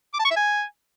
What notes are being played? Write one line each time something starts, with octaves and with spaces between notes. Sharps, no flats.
D6
A5
C#6
E5
G#5